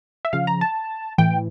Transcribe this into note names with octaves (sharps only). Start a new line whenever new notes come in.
E5
C#3 F3 F5
A#5
A5
A2 E3 G5